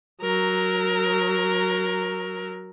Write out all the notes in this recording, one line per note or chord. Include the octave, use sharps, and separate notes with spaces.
F#3 A#4